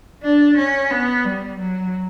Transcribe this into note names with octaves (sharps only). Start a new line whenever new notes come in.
D4
C#4
B3
G3
F#3